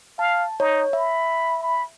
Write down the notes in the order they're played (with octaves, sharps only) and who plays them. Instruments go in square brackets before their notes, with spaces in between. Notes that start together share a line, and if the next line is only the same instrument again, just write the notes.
[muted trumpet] F5 [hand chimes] A5
[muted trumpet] D#4 [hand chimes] C#5
[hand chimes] E5 [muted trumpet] B5
[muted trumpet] B5